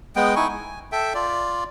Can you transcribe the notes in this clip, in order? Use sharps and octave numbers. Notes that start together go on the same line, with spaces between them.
G#3 B3 G5
D#4 E4 G#5 C#6
G#5
A4 E5 G5
F4 D5